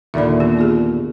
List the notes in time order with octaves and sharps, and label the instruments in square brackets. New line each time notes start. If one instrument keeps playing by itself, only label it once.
[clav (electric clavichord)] D#2 A#2 D3 [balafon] E5 B5
[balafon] B3 G4
B3 F4 G#4